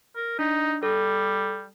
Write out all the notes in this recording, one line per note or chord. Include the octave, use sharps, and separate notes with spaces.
A#4
D4 D#4
G3 A4